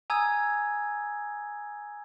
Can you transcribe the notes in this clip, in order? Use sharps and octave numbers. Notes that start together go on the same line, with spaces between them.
G#5 A#5 D#6 E6 G#6